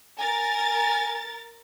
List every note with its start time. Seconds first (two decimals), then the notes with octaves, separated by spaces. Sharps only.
0.19 A#4 G#5 A6